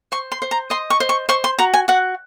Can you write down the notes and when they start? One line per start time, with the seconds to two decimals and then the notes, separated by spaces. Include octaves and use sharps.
0.12 C5 C#6
0.32 C6
0.42 C5
0.51 A#5
0.70 D#5 C6
0.90 C#6
1.00 C5
1.09 C#6
1.29 C5 C#6
1.44 C6
1.59 F#4 A#5
1.74 G#5
1.88 F#4 F#5